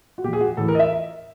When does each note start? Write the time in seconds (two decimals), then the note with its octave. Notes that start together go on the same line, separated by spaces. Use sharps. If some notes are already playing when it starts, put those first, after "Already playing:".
0.18 F#4
0.24 A#2 G4
0.28 F3
0.33 G#4
0.41 F#4
0.57 A2 E3 A4
0.68 A#4
0.75 D#5
0.79 E5